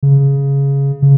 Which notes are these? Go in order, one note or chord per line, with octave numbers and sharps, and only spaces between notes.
C#3
C#3